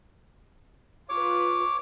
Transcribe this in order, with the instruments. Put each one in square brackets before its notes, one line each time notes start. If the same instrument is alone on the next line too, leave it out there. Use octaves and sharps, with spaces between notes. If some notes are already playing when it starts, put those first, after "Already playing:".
[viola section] F4 B4 [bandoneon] C#5 D6